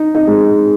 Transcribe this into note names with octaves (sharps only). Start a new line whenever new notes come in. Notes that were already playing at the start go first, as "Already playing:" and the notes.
Already playing: D#4
D#4
G#3